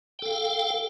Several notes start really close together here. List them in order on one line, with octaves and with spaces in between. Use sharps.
G5 A4 F5